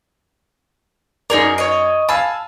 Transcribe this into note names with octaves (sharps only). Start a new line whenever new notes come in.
F#2 D#4 G#4 A#4 D5
C#5 D#5
F5 G#5 A5 B5 E6